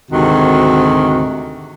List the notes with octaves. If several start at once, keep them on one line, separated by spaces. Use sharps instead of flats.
D2 G#2 C3 D#3 F#4